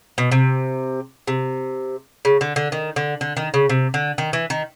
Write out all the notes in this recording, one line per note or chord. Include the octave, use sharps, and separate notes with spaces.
B2
C3
C3
C#3
D3
D3
D#3
D3
D3
D#3
C#3
C3
D3
D#3
E3
D#3